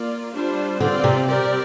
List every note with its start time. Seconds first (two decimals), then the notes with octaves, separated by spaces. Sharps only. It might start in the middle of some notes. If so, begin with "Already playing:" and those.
Already playing: A#3 F4 D5
0.34 G3 D4 F4 C5
0.80 D3 C4 F4 D5
1.04 C3
1.27 G3 C4 G4 A#4 D5